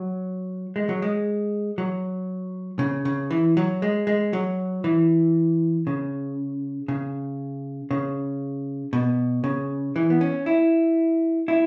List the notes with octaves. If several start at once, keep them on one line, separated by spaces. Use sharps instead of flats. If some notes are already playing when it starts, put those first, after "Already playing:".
Already playing: F#3
G#3
F#3
G#3
F#3
C#3
C#3
E3
F#3
G#3
G#3
F#3
E3
C#3
C#3
C#3
B2
C#3
E3
B3
C#4
E4
E4